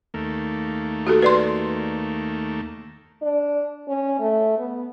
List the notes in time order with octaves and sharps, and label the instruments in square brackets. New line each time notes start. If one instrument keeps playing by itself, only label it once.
[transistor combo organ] D#2 A3 A#3
[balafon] F#4 G4 A4
B4 D5 C6
[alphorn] D4
C#4
A3
B3